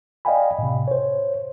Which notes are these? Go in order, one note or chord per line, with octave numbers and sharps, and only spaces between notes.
D5 D#5 F5 G5 G#5 B5
A2 C3
C5 C#5